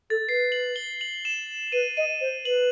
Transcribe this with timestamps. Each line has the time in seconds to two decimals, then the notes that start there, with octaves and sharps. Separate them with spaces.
0.10 A4 A6
0.28 B4 C7
0.52 F#7
0.76 G7
1.01 F#7
1.25 E7
1.72 B4 D#7
1.97 D#5 D#7
2.21 C5
2.45 B4 F#7